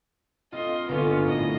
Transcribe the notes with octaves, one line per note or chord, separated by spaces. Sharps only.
C4 F4 D#5 C6
G1 B3 C#4 F4 A#4
A2 D#5